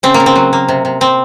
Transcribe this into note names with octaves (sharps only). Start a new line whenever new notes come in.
C#3 C4
A#3
C#3
C4
F#3
A#3
C3
C3
C3 C4